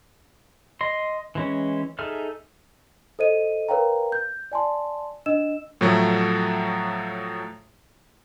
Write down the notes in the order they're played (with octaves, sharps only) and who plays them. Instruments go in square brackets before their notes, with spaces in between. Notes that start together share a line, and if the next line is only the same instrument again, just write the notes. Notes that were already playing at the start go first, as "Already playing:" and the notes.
[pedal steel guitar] D#5 C6
E3 G#3 C#4
D#4 G#4 A4 E5 F6
[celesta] A4 C5 D#5 D#7
A#4 B4 C#5 F5 G5 A#5
G6
D5 G#5 A5 C6
D4 D#5 E6 E7
[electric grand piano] A2 F3 F#3 A3